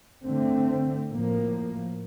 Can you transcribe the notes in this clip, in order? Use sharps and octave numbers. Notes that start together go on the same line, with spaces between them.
D3 A3 C4
A2 F3 A#3